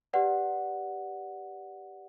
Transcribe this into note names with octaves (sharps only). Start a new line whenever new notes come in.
G4 B4 D5 F#5